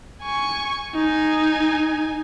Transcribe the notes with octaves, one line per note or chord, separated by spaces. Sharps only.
G#5 C#6
D#4 G#5